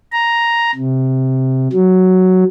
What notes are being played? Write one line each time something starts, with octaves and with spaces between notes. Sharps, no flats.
A#5
C3
F#3